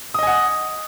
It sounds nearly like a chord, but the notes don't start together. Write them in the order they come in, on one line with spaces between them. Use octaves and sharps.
D#6 D#5 G#5 F#5